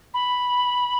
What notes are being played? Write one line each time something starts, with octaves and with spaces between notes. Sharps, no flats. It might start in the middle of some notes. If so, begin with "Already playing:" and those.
B5